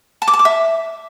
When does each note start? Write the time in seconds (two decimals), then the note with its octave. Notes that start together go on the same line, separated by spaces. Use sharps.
0.22 A5
0.28 D6
0.33 A5
0.39 D6
0.45 E5